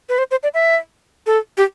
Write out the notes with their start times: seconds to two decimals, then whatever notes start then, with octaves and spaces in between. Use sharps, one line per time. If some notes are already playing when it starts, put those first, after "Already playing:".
0.09 B4
0.18 C5
0.31 C5
0.43 D5
0.54 E5
1.27 A4
1.58 G4